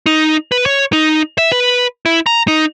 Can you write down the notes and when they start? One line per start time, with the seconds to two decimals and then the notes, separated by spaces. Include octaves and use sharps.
0.06 D#4
0.52 B4
0.66 C#5
0.93 D#4
1.38 E5
1.52 B4
2.06 E4
2.26 A#5
2.48 D#4